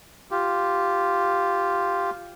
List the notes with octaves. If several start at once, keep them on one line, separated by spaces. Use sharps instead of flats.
F4 G4